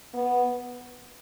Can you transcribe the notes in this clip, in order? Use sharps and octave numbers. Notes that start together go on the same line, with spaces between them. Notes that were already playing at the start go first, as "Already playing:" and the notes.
B3